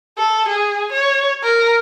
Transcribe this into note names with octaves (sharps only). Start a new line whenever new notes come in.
A4
G#4
C#5
A#4